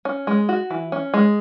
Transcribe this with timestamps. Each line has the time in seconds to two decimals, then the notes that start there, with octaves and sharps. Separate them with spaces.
0.05 C#4
0.27 G#3
0.49 F#4
0.70 E3
0.92 C#4
1.14 G#3